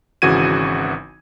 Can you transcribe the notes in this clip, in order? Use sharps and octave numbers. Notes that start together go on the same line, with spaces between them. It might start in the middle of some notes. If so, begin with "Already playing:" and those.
G#1 C#3 E3 F#4 G#6 D#7